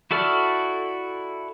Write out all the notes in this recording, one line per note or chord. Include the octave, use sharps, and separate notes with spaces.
E4 F#4 A4 D5 F6